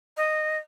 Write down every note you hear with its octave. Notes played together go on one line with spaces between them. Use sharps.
D#5